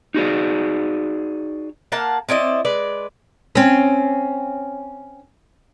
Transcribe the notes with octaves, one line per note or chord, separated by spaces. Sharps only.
D#4 F#4 G#4 D5
A#3 F5 F#5 A5
C4 E4 D5 D#5
G#3 B4 D5
C4 C#4